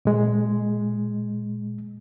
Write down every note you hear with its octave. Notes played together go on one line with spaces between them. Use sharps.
A#2 G#3